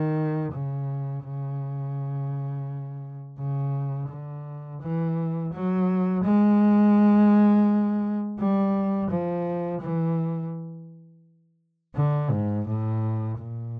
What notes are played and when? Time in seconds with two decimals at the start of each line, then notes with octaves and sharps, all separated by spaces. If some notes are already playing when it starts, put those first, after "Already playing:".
Already playing: D#3
0.52 C#3
1.24 C#3
3.39 C#3
4.09 D3
4.81 E3
5.52 F#3
6.23 G#3
8.39 G3
9.10 F3
9.81 E3
11.95 D3
12.31 G#2
12.67 A2
13.38 A#2